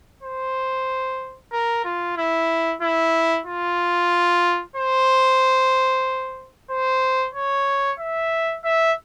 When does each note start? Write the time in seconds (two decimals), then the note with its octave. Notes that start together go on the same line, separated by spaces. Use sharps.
0.23 C5
1.52 A#4
1.84 F4
2.17 E4
2.82 E4
3.46 F4
4.76 C5
6.70 C5
7.34 C#5
7.99 E5
8.64 E5